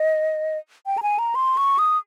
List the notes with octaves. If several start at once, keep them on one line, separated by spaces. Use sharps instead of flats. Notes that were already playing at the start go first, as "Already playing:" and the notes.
Already playing: D#5
G5
A#5
G#5
A#5
C6
C#6
D#6